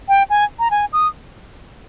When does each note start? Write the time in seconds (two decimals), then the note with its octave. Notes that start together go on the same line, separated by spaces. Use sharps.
0.08 G5
0.30 G#5
0.59 A#5
0.71 G#5
0.93 D#6